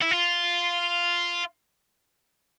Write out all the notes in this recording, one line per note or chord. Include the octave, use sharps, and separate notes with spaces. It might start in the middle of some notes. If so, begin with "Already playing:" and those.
E4
F4